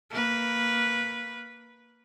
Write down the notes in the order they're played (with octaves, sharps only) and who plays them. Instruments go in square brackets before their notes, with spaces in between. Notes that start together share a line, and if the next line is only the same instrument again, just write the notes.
[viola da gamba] A#3 B4